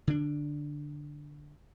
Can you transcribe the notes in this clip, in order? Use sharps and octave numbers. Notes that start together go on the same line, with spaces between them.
D3 D4